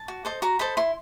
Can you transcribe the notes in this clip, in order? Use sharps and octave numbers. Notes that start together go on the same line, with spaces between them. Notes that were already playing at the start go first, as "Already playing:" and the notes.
Already playing: A5
F#4
A4 C5 D#5
F#4 A#5
A4 C5 D#5 B5
E4 C6